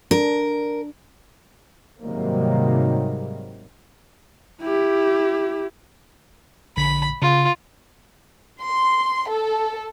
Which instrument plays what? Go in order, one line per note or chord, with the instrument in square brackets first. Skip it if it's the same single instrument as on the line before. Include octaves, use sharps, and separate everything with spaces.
[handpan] D4 [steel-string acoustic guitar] A#4
[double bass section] G#2 C3 D#3 F#3 G3 A#3
[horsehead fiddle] E4 G4
[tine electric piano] A#1 D3 B6 [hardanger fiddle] B5
[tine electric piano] C#3 [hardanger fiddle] F4
[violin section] C6
A4